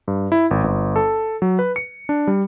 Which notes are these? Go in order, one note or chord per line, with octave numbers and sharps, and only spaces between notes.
G2
E4
G#1
G1
A4
F#3
B4
C#7
D4
G3